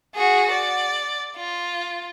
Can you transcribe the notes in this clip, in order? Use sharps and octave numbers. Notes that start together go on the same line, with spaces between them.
F#4 G#4
D5
F4